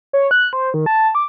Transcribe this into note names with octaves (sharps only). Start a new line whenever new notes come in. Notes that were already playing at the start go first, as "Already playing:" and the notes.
C#5
F#6
C5
D#3
A5
D6